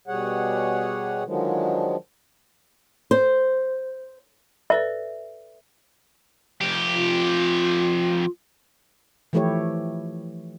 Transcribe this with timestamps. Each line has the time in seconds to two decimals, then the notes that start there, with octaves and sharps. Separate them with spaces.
0.08 B2 G3 G#4 C#5 F#5
1.25 D3 D#3 F3 F#3 G#3
3.11 C5
4.70 A4 B4 D5 E5
6.61 F2 G4
6.94 F4
9.33 E3 F3 A3 E4 G4 C#5